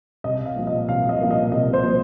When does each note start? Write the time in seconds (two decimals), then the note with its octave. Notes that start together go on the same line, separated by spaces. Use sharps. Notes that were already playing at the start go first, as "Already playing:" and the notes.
0.24 C2 D#5
0.45 F5
0.56 A#2 F3 A#3
0.67 D#5
0.88 C2 F5
1.09 D#5
1.20 A#2 F3 A#3 F5
1.31 D#5
1.52 C2 D#5
1.73 C5
1.83 A#2 F3 A#3